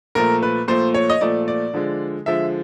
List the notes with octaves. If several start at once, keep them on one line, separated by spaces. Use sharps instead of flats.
A#2 F3 A3 A#4
B4
A#2 F3 A3 C5
C#5
D#5
A#2 F3 A3 D5
D5
D3 F3 G#3
D3 F3 G#3 E5